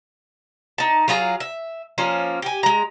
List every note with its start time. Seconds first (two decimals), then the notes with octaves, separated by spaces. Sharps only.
0.78 D#4 A5
1.08 F#3 F4 G#4 A#5
1.40 E5
1.98 F3 A#3 C#4
2.42 G4 G#5
2.63 G#3 A#5